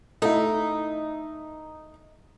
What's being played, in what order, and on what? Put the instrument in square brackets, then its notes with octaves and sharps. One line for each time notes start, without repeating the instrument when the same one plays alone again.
[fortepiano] A3 E4 [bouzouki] D#4